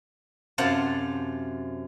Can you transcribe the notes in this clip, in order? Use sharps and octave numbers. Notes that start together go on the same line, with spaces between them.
F#2 C3 F4 C5 F#5 A5